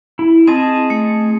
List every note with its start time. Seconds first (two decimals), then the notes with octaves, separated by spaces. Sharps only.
0.19 E4
0.47 C4 G#4 D#5 A5
0.90 A3